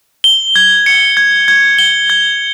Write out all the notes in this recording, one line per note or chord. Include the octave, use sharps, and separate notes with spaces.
G7
G#6
C#7
G#6
G#6
G7
G#6